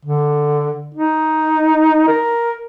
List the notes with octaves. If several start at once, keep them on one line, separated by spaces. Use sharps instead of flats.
D3
D#4
A#4